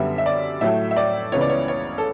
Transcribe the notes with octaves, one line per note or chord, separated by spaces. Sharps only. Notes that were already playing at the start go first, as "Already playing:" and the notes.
Already playing: F#2 D3 G3 B3 E5
E5
D5
A2 F#3 A3 E5
E5
D5
C#2 C#3 E3 B3 C#5
D5
C#5
C#5
A4